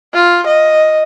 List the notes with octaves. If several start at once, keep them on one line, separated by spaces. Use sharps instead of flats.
F4
D#5